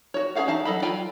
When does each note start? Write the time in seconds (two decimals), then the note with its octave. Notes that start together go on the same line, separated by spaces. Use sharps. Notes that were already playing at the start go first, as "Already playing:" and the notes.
0.14 F#4 C#5
0.35 C#4 G#4 C#5 F5 F#5
0.48 E3 D#4 F5 A5
0.65 F#3 A4 D#5 B5
0.82 F4 G5 G#5 B5